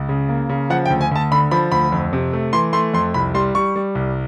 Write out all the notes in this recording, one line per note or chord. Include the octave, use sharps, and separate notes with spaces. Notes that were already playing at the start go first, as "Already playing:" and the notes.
Already playing: C#2
C#3
A#3
C#3
F3 F#5
G5
D2
G#5
D2 A5
D3 B5
F3 B5
D2 B5
F2
C3
A3
E3 C6
A3 C6
F2 C6
C2 B5
G3 C6
G3 C#6
G3
C2